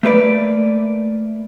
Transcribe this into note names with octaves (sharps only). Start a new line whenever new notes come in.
A3 A#3 B4 D5